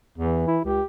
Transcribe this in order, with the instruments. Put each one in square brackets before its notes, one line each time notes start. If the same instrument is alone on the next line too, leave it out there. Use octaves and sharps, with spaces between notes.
[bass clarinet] E2 [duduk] E3
[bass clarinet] E4
[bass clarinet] C#2 [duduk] G4